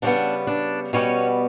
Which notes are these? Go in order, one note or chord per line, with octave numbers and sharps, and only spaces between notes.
C#3 G3 B3 D4
D4
B2 G3 B3 C#4